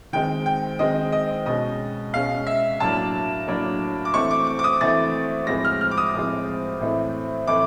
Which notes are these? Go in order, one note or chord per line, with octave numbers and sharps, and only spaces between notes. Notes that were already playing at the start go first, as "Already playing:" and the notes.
D#3 G#3 C4 G5
G5
D#3 G#3 C4 D#5
D#5
B2 G#3 C#4 D#5
B2 G#3 C#4 F5
E5
A2 F#3 A#3 D4 A5
A2 F#3 A#3 D4
D6
E3 A3 C4 C#6
D6
D6
D6
D#6
E3 A3 C4 A6
A2 F3 G#3 C4 A#6
F6
F6
D6
D#6
A2 F3 G#3 C4
A2 E3 A3 C4
A2 E3 A3 C4 D6